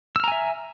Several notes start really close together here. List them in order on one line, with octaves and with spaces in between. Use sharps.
E6 F6 A#5 G#5 E5